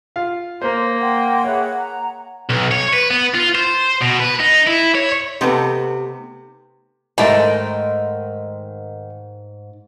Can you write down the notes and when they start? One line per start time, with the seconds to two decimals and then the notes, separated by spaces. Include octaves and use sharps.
0.16 F4 F5
0.62 A#3 A#4 C5 C6
1.01 F#5 G5 C6
1.44 G#4 B4 C#5 E5
1.77 A#5
2.50 B1
2.72 C#5
2.93 B4
3.10 B3
3.34 F4
3.55 C5
4.02 B2
4.20 B4
4.40 D#4
4.67 E4
4.95 C#5
5.41 C3 A3 B3 D#4
7.18 G#2 D#3 A3 A#4 C5 B5